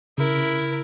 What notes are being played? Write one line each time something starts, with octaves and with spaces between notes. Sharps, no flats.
C#3 E4 A#4